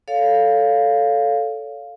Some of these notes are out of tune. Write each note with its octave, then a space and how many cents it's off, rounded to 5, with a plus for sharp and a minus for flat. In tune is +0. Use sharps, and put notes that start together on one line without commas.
A4 +0 C#5 +25 F5 +0